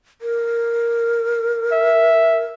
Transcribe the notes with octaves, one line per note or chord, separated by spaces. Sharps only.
A#4
E5